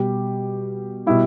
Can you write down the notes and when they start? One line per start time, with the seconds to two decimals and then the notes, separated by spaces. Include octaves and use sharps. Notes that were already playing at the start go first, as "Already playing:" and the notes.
Already playing: B2 G3 G4
1.06 B2 G3 E4